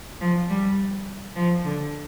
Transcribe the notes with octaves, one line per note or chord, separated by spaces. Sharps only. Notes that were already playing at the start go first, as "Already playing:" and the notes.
F3
G3
F3
D3